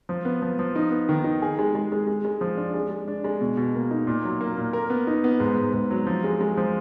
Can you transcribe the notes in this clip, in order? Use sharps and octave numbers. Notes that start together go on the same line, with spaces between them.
F3
B3
F3
F3
D#4
B3
D#3
D#4
G#4
G#3
G#3
G#3
G#3
G#3
F3
D4
G#3
G#3
D4
G#3
B2
B2
A#3
D#4
A#2
F#3
A#3
A#2
A#4
B3
D#4
B3
G#2
G#2
G#2
F#3
F3
G#3
G#3
F3